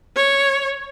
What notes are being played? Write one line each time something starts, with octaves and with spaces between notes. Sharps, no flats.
C#5